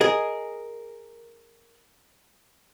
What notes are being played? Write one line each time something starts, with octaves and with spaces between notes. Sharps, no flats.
G#4 A#4 D#5